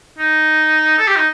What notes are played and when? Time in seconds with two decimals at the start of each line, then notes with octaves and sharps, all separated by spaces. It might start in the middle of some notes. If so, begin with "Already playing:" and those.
0.18 D#4
0.98 A4
1.07 G4
1.16 D#4